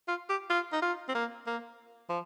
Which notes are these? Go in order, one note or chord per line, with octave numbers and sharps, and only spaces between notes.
F4
G4
F4
D#4
F4
C4
A#3
A#3
F3